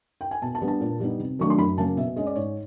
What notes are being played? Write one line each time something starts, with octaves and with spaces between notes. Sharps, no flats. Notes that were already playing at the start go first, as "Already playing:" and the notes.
G5
G#5
B2 A5
A5
G3 B3 D4
A5
A#2
G3 B3 D#4
C3
D#3 F#3 A3 D4 C#6
C6
F#2 B5
C#3 F#3 A#3 C#4 A5
B2 E5
G#3 C#4 D#5
D5
G#2 C#5